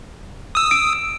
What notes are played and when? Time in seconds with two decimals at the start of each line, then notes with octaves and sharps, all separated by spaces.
0.55 D#6 E6
0.71 D7